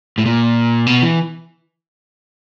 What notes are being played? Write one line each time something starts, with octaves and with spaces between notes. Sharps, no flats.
A2
A#2
B2
E3